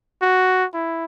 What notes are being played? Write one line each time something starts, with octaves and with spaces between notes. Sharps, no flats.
F#4
E4